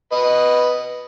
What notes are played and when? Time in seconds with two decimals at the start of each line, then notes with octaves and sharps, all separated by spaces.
0.12 B4 D#5